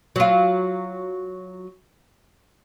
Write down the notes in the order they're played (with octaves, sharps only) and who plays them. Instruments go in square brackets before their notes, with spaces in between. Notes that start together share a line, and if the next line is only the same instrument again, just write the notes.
[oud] F#3 F4